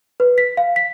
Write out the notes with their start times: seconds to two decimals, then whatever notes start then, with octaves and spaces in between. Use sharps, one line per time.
0.20 B4
0.38 B6
0.57 F5
0.76 B6